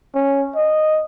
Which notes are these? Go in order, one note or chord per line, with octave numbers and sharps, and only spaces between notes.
C#4
D#5